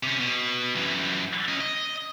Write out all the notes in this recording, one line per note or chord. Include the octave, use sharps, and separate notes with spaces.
C3 C#4
B2
F#2 E3
C#4 D#5
D#5